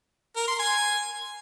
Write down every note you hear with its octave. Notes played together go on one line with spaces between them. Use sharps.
A#4
C6
G#5